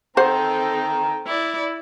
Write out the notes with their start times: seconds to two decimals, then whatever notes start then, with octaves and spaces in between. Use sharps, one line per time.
0.17 C4 D#4 A4 C5 F#5 G5 A#5
1.26 E4 D5